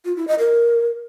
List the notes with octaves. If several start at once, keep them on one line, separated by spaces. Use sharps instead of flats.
F4
E4
D#5
A#4